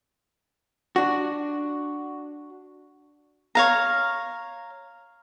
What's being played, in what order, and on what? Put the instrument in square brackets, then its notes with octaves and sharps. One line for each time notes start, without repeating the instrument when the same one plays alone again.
[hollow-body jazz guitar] D4 F#4
[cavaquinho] C#5 F5 A#5